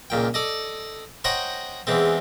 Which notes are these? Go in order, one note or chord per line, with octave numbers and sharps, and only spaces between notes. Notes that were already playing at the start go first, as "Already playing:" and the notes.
C#2 A#2 G5
A4 D5 D#5
C5 C#5 D#5 F#5 G5 A#5
E2 E3 G#3 C4